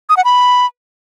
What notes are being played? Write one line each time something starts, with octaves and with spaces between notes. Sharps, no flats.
D#6
F#5
B5